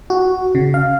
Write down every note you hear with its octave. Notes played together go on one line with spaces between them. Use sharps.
F#4
C#3
F5